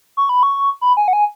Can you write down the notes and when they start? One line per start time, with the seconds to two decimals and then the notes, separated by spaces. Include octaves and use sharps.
0.17 C#6
0.29 B5
0.43 C#6
0.81 B5
0.97 G#5
1.08 F#5
1.13 G#5